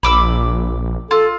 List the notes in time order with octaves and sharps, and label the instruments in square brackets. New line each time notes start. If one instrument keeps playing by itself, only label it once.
[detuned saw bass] A#1 [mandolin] B5 D6 E6
[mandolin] F4 [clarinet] A4